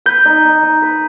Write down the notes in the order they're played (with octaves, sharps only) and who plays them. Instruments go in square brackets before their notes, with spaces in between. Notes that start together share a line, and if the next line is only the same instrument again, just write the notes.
[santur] B4 [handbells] G6
[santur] D#4
D#4
D#4
B4